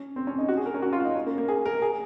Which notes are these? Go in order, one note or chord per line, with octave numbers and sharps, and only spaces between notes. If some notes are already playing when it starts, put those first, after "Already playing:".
Already playing: C#4
C4
C#4
D#4
F#4
G#4
A#4
C#4
F#4
F4
D#4
C#4
A#3
A#3
G#4
A#4
G#4